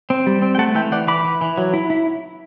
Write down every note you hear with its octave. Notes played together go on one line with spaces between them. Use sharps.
C4
G3
C4
G5
A3 F#5 A5
E3 E5 G5
E3 D5 F#5
E3 B5 D6
E3
E3
F#3
E4
E4